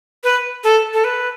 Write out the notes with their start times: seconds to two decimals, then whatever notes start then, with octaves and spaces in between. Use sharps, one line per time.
0.24 B4
0.64 A4
0.93 A4
1.04 B4